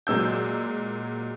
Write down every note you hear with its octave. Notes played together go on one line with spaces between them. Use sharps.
A#2 F#3 G#3 E6 G6